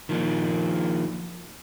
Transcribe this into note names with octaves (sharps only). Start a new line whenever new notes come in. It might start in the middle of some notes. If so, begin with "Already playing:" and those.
D#3 F3 A#3